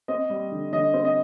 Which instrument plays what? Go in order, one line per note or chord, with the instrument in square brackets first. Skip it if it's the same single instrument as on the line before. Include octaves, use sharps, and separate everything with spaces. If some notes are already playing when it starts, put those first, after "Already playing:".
[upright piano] C4 D#5
G3
D3
D3 D#5
C4
D#5